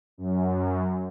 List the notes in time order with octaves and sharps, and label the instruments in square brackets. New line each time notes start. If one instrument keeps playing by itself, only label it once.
[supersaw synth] F#2